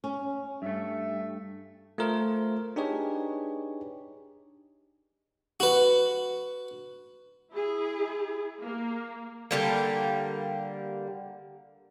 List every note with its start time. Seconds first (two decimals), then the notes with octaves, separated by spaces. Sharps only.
0.04 C#4
0.62 G2 A3 E5
1.98 A3 F4 A#4 C5
2.76 D4 D#4 G4 G#4 B4 C#5
5.60 F#4 B4
7.52 E4 G#4
8.61 A#3
9.51 D3 G3 A#3